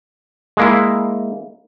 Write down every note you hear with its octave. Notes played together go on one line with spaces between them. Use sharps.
G#3 A#3 E4